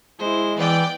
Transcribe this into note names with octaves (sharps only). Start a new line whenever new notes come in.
G#3 E4 C5
E3 B3 D5 G5